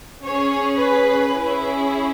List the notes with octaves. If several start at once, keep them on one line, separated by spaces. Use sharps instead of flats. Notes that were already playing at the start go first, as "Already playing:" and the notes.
C#4 G#4 C#5
B4
C#4 E4 G#4